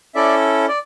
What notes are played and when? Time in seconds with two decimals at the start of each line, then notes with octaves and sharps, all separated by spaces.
0.15 C#4 E4 A4 D5 E5
0.68 D5